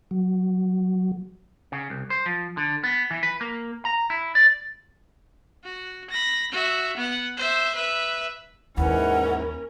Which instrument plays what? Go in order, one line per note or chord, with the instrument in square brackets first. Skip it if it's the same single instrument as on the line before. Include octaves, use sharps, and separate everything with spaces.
[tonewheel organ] F#3
[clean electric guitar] C#3
C2
C5
F3
D3
B3
E3
B4
A#3
A#5
E4
D5
[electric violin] F#4
B5 A#6
F#4 E5
B3 F#5
C5 E5
B4 E5
[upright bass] D#2 [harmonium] G#2 E3 E4 [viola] C#4 A#4 [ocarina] F#5